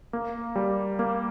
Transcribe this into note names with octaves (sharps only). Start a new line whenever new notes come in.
A#3
G3
A#3